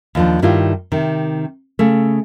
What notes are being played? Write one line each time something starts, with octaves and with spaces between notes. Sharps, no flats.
D#2 F3 D4
G2 D#3 G3 E4 F4
C3 D#3
C#3 A3